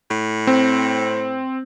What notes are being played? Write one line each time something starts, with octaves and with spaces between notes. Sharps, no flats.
A2
C4